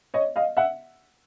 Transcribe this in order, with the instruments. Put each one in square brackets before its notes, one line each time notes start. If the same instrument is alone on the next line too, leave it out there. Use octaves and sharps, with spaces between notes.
[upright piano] C#5 D#5
D#5 F5
E5 F#5